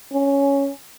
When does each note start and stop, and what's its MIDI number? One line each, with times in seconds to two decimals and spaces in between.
0.13 0.71 61